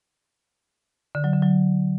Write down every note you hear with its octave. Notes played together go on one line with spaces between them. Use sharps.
D3
F#3
D3
F#3